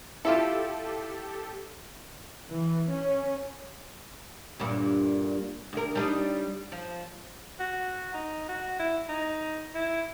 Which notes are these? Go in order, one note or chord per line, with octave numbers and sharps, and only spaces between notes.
E4 F4 G4 A4
E3
C#4
D2 G2 A#2
D2 A#4
G3 D4 D#4
F3
F#4
D#4
F#4
E4
D#4
E4